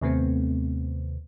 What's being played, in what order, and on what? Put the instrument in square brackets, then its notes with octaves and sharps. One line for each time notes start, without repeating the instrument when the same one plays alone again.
[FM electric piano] D#2 C3 A3 B3 C4